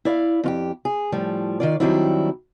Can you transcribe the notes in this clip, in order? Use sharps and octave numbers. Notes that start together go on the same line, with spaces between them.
E4 D5 F5
F2 F4 G4
G#4
A2 F3 G3
D#3 F4 D5
D#3 F#3 G3 C4 D4 E4